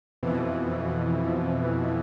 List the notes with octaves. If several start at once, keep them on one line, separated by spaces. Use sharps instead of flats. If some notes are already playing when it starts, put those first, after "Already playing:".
F2 B2 E3